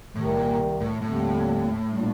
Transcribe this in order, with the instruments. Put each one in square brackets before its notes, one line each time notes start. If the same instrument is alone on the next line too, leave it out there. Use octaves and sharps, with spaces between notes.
[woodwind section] C2 C3 D#3 [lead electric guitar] A2
[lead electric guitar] A#2
A2
[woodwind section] D#2 D3 G3 C4 [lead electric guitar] A2
[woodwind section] A#2 G3 A#3 D4